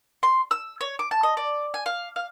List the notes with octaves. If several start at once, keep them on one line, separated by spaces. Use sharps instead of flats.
C6
E6
C#5
D6
A5
D#5
D5
G#5
F5
F5